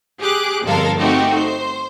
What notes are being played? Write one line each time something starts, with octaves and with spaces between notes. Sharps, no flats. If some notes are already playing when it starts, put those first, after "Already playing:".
G4 G#4 D6 F#6
G1 F2 G#3 A4 A#4 F5
A3 C4 D#4 F#4 G4
C5